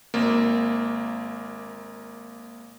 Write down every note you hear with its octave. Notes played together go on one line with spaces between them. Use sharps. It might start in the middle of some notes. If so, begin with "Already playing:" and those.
G#1 A#3